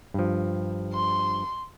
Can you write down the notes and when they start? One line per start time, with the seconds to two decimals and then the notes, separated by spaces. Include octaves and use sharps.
0.14 G2 F3
0.94 C6